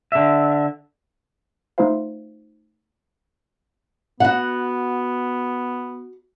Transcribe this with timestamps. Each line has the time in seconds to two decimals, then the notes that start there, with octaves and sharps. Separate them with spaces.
0.12 D3 E5
1.78 A3 D#4 F4 C5 F5
4.20 B3 F#4 F#5